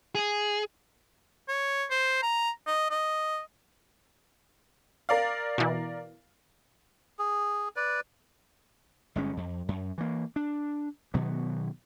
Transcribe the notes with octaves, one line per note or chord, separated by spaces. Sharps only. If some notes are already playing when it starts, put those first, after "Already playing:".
G#4
C#5
C5
A#5
D#5
D#5
A#4 D5 F5
B2 E3
G#4
B4 D5
G1 G#3 C#4
F2
F#2
E3 A#3
D4
B2 D#3 F#3 B3